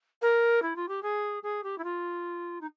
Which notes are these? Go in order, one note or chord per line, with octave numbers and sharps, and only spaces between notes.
A#4
E4
F4
G4
G#4
G#4
G4
E4
F4
D#4